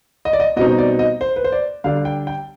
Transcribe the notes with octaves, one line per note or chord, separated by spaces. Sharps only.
D#5
D5
D#5
B2 G3 C4 D#4 D#5
D5
D#5
C5
B4
C5
D5
D3 G3 D4 F5
G5
G5